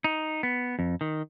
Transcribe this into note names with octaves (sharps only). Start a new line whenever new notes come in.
D#4
B3
F2
D#3